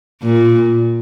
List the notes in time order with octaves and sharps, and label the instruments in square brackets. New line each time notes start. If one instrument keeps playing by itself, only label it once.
[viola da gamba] A#2